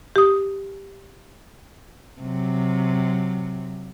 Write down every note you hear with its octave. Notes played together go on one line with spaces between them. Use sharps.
G4 D#6
C3 F#3